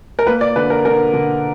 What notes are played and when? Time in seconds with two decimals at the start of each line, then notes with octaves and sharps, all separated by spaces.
0.19 A#4
0.26 A#3 B4
0.41 D5
0.56 D3 B4
0.70 A#4
0.85 D3 A#4
1.13 D3